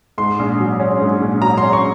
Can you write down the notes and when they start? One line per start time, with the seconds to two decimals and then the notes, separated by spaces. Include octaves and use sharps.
0.18 G#2 C6
0.39 A#1
0.60 F#3
0.80 C#4
1.01 G#2
1.22 A#1
1.42 F#3 A#5
1.58 C6
1.63 C#4
1.73 C#6